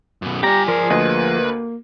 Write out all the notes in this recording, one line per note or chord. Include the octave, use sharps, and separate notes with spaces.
F#2 B2
G3 G4 D5 G#5 A#5
F3 G#4 A#4
D2 A#3 B4 D#5